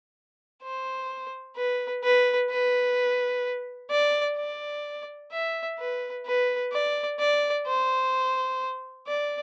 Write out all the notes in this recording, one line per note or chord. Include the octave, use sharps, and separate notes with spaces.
C5
B4
B4
B4
D5
D5
E5
B4
B4
D5
D5
C5
D5